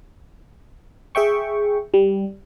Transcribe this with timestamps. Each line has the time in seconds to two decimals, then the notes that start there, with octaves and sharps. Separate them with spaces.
1.15 G#4 E5 G5 C#6
1.94 G3